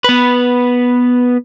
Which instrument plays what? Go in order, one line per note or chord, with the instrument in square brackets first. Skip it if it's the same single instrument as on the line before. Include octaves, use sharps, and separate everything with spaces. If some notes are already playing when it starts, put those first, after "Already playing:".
[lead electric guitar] B3 B4